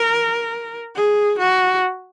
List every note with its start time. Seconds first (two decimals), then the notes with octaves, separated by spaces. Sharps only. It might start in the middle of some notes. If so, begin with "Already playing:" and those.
Already playing: A#4
0.95 G#4
1.39 F#4